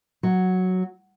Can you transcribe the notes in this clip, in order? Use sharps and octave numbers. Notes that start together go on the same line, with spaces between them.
F#3